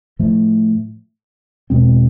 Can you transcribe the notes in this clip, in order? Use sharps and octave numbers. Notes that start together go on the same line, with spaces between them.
A2 F3 A3
E2 B2 G#3 C4